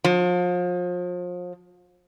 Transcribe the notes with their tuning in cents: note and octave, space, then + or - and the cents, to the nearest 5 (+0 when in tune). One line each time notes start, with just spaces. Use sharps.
F3 +35